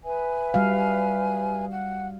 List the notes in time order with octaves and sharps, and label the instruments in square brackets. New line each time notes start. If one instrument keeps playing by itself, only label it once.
[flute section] B4 E5 G#5
[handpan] G3 F#4 F5
[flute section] F#5